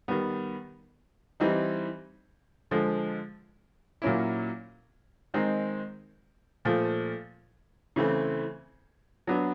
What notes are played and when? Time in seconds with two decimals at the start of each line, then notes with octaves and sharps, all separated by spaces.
0.08 D#3 G3 B3
1.40 E3 G3 C4 D#4
2.71 D3 F3 G#3
4.02 A#2 F#3 A#3 C#4 E4
5.34 D#3 G#3 C4 D#4
6.65 A#2 F3 A3
7.96 C#3 E3 A3 C4
9.27 F#3 B3 D4